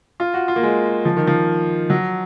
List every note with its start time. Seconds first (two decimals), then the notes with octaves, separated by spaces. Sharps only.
0.20 F4
0.34 F#4
0.48 F4
0.56 A#3
0.63 G#3
1.05 F3
1.17 D#3
1.27 F3
1.90 F#3